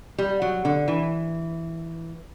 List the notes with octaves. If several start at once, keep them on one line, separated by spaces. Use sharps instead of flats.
G3
F#3
D3
E3